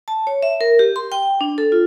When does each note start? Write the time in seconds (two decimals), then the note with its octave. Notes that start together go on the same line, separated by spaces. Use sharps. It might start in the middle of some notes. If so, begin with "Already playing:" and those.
0.08 A5
0.27 C#5
0.43 E5
0.61 A#4
0.79 G4
0.96 C6
1.12 G5
1.41 D4
1.58 A4
1.72 F4